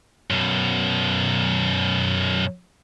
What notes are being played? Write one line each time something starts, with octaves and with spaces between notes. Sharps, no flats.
F#2 B2